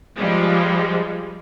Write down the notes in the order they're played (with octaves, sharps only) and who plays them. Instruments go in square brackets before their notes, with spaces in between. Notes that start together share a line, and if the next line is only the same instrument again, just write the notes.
[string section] F3 G3 G#3